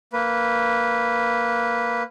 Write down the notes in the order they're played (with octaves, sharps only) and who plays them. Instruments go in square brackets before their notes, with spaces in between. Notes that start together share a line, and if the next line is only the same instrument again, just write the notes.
[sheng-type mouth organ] A#3 B4